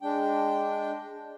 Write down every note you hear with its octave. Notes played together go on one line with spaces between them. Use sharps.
G#3 D4 G5